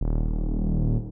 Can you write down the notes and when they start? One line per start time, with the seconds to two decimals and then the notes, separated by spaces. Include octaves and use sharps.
0.01 D#1